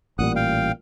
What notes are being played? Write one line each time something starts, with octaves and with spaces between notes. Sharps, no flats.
A1 A#2 G3 F#5 D#6 F#6
F5 G5